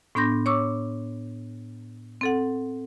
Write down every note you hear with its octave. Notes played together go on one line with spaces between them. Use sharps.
A2 B3 D4 C6 G6 A#6
C#5 C#6 D6 E6
C4 A4 F#5